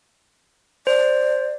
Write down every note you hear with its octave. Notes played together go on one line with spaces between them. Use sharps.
C5 D5